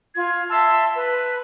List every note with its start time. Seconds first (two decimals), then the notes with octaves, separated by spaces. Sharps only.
0.14 F4 G#6
0.50 E5 A5 C6 E6
0.95 B4